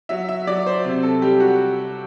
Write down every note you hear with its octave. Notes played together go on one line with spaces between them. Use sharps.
F#3 E5
E5
F#3 D5
C5
C3
A4
G3 G4
F#4